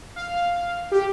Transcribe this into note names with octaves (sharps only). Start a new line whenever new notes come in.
F5
G4